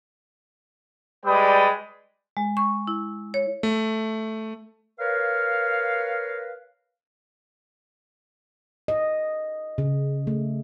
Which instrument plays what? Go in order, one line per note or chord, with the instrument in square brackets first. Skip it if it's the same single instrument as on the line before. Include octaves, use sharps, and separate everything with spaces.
[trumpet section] G3 G#3 B4 D5 G5 D#6
[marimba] G#3
C#6
E4
C#5
[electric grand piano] A3
[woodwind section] A#4 B4 C#5 F5
[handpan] D#5
C#3
A3